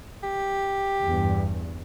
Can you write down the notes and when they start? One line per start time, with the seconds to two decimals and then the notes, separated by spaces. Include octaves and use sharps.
0.23 G4
1.03 E2 G2